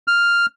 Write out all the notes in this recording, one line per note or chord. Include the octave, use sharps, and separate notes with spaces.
F6